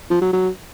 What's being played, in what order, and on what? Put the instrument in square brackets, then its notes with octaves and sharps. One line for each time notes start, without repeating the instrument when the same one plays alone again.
[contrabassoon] F3
F#3
F#3